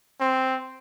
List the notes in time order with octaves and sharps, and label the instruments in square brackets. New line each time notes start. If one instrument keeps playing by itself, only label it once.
[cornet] C4